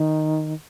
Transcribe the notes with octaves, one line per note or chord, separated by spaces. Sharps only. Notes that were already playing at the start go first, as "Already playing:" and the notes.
Already playing: D#3